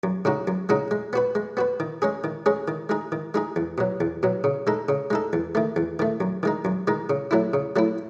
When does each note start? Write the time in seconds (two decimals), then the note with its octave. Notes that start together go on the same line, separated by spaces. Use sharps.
0.03 F#2
0.25 C#3 G#3 D#4 F#4
0.47 F#2
0.69 C#3 G#3 D#4 F#4
0.91 G#3
1.13 B3 F#4 B4
1.35 G#3
1.57 B3 F#4 B4
1.80 D#3
2.02 G#3 C#4 G#4
2.24 D#3
2.46 G#3 C#4 G#4
2.68 D#3
2.89 G#3 D#4 G#4
3.12 D#3
3.34 G#3 D#4 G#4
3.56 E2
3.78 B2 F#3
4.01 E2
4.23 B2 F#3
4.44 C#3
4.67 G#3 D#4 A4
4.89 C#3
5.11 G#3 D#4 A4
5.33 E2
5.55 D#3 A3
5.76 E2
5.99 D#3 A3
6.20 F#2
6.43 D#3 G#3 D#4
6.65 F#2
6.87 D#3 G#3 D#4
7.10 C#3
7.31 F#3 A3 E4
7.54 C#3
7.76 F#3 A3 E4